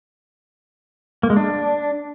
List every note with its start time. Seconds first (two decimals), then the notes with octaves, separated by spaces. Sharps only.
1.23 A#3
1.30 G#3
1.36 D4